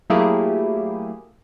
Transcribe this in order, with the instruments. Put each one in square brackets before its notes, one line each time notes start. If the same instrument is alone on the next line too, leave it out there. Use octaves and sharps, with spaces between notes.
[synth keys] F#3 A3 A#3 E4 G4 G#4